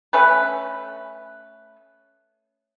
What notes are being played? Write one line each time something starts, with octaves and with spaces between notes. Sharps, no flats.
A3 C#4 B4